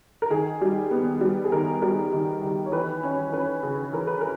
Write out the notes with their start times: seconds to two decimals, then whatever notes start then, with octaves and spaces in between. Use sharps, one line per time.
0.22 A#4
0.30 D#3 G#4
0.61 G3
0.91 B3
1.21 G3
1.44 G#4
1.52 D#3 A#4
1.82 G3 A#4
2.13 D#3
2.43 D#3
2.66 C#5
2.72 E3 B4
3.03 C#4
3.32 C#4 B4
3.63 C#3
3.93 E3 A#4
4.07 B4
4.21 A#4